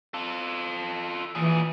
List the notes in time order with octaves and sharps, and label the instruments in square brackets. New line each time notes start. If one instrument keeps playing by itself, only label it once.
[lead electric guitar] F4 A4
[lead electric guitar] A#2 G#4 [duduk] E3